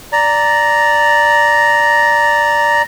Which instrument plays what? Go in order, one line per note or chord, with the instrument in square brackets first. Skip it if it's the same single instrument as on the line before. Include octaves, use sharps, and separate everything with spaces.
[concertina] D5 A#5